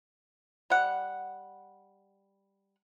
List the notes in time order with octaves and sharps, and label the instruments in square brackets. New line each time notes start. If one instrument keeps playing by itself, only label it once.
[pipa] G3 F#5